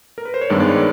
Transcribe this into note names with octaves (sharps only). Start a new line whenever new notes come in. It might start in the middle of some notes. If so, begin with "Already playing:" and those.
A#4
B4
C5
C#5
G2 D#3 G#3 B3 D5
D5
C#5